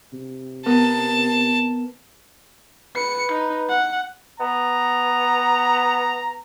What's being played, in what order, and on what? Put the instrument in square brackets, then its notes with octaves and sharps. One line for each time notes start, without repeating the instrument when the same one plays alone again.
[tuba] C3
[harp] B3 A#4 D#6 [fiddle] A5
[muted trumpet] B4 [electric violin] C#7
[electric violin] D#4
F#5
[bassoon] B3 [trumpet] A#5